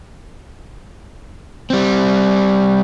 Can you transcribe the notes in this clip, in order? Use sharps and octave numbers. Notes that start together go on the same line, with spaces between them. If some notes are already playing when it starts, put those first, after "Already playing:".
G3 C4